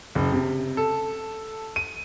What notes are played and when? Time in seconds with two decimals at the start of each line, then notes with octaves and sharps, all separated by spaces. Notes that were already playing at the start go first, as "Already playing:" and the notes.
0.15 F#1
0.32 C3
0.77 A4
1.76 D#7